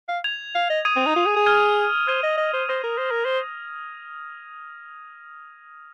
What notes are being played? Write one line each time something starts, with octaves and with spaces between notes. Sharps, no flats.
F5
G#6 F7
F5
D#5
D#6 G#6 D#7
C4
D#4
F4
G#4
G#4
F6 G#6 D#7
C5 F6 G#6 D#7
D#5
D#5
C5
C5 D#6 A#6 D#7
A#4
C5
A#4
C5